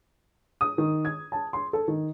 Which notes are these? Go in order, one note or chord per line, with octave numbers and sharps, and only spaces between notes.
D#6
D#3
G#6
A5
C6
A4
D#3